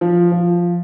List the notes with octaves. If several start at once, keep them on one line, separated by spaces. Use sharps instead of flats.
F3
F3